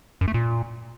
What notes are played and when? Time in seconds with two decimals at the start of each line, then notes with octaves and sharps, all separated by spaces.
0.21 F#2
0.28 A3
0.34 A#2